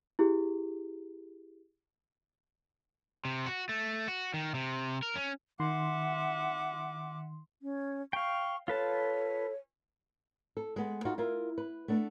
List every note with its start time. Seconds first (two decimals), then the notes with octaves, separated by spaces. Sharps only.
0.19 E4 G4 G#4
3.25 C3
3.46 F#4
3.69 A3
4.08 F#4
4.34 D#3
4.55 C3
5.03 A#4
5.15 C#4
5.60 D#3 E5 F#5 C6 D6
7.62 C#4
8.13 F5 G5 C#6
8.68 F4 A4 B4 C#5 A5
10.57 A4
10.76 G#3 B3
11.05 D#4 F4 F#4
11.18 E4 F4 A#4
11.58 B4
11.88 A3 B3 D4